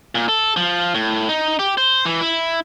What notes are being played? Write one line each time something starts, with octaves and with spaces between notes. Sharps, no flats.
A#2
A4
F3
A2
D#4
G4
C5
E3
E4